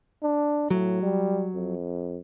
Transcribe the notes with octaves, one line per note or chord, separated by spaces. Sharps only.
D4
A2 F#3
G3
F2